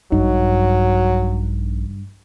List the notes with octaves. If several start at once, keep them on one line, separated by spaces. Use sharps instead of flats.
A#1 G2 F#3 D#4